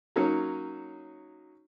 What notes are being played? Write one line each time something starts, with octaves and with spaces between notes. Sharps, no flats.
F#3 A#3 C#4 D#4 F#4